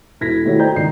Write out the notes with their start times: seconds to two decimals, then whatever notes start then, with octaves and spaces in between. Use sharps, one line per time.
0.21 E1 E4 A4 G#6 A#6 B6
0.45 D#3 A3 E4 F#4 G4 C#5
0.58 C5 D5 D#5 G5 A#5 G6
0.76 C#2 D#3 A#5 C7